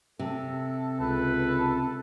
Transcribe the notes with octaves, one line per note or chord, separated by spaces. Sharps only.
C3 A4
C#2 A4 B4